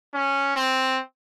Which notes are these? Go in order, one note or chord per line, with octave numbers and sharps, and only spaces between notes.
C#4
C4